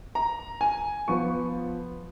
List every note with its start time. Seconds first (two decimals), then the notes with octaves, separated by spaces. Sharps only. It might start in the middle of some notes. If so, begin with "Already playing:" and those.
0.15 A#5
0.61 G#5
1.08 F3 B3 C#6